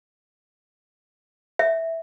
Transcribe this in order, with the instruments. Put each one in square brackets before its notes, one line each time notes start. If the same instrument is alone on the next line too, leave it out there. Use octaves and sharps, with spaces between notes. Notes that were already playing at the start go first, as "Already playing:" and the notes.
[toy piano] E5